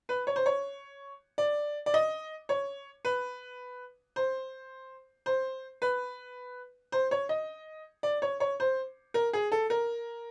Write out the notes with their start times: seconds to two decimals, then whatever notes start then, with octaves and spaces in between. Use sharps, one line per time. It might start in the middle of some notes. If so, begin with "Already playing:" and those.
0.09 B4
0.27 C#5
0.36 C5
0.46 C#5
1.38 D5
1.86 D5
1.94 D#5
2.49 C#5
3.05 B4
4.16 C5
5.26 C5
5.82 B4
6.92 C5
7.11 C#5
7.29 D#5
8.03 D5
8.22 C#5
8.40 C#5
8.60 C5
9.14 A#4
9.33 G#4
9.52 A4
9.70 A#4